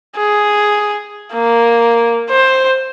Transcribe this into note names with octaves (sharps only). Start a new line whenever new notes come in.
G#4
A#3
C5